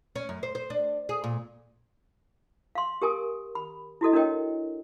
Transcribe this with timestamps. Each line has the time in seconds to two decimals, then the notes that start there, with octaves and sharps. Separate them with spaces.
0.16 C#4
0.29 F#2
0.43 C5
0.55 C5
0.70 D4
1.09 G#4
1.24 A#2
2.75 F5 C6
3.02 G4 A#4 G#5 D#6
3.55 B5
4.01 E4 F#4 A4 D#5
4.13 D4 F#4 A#4 C#5 D#5 G5